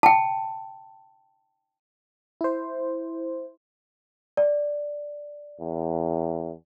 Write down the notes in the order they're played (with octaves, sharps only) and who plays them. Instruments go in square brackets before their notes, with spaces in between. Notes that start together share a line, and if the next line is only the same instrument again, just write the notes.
[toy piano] G5 A5
[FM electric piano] E4 C5
[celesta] D5
[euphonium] E2